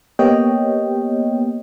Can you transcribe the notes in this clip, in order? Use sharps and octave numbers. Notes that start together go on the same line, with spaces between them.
A#3 B3 G4 C#5 D#5 G5